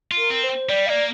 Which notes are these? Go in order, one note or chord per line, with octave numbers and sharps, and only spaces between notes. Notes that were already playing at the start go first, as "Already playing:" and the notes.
F4
A#4
C4
C5
G3 D5
A#3 D5 F5